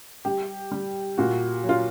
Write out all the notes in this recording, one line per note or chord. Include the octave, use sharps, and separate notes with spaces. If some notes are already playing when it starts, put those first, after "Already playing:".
G3 G4
G3
A#2 F#4
F#3
F4